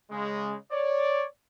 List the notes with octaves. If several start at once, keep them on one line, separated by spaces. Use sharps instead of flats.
C#3 G#3
C#5 D5